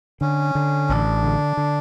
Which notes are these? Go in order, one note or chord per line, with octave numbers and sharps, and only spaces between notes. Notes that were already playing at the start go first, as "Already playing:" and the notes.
D3 C#4
D3
A1 D4
D3
D3